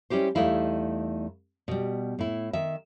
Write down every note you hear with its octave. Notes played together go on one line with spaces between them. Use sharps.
G3 C#4 E4 G4 C5
E2 G3 A3 D#4 E4 F5
B2 G3
A2 E4
D#3 E5